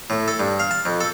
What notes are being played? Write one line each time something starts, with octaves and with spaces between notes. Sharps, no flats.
A2
A4
G2
F5
A5
F2
A4